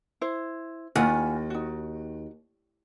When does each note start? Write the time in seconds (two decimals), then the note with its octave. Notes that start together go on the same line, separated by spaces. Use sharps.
0.21 E4 C5
0.96 D#2 F4 F#5 G#5
1.50 D#4 F#4